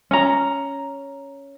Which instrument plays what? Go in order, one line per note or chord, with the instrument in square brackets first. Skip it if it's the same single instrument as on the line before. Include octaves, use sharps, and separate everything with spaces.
[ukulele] C#4 A#5